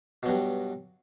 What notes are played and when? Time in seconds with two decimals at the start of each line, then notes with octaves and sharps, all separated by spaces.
0.23 B2
0.26 F#3
0.28 G2